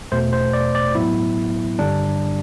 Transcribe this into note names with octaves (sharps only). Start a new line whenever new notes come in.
E2 B2 A3 C5
C5
D5
D5
A2 F#3 B3 E4
G2 D3 G3 D4